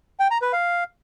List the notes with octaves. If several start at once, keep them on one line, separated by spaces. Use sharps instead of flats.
G5
A#5
B4
F5